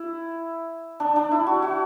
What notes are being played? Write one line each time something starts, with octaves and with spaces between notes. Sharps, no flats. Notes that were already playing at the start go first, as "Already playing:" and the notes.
Already playing: E4
D4
D4
E4
F#4
F#4